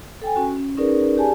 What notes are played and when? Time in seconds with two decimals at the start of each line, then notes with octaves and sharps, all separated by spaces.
0.22 A4 G5 G#5
0.36 C#4 F#4
0.57 C#4
0.77 C#4 D#4 G#4 A#4 B4 D5
1.17 G4 G#4 D5 G#5 A5